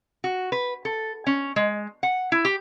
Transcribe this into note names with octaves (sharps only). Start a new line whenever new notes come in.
F#4
B4
A4
C#4
G#3
F#5
E4
G4